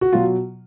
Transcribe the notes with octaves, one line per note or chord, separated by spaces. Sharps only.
F#4
B2 F#3 F4